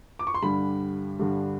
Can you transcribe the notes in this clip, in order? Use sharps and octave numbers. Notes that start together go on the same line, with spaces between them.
D6
C#6
C6
G2 D3 G3 B5
G2 D3 G3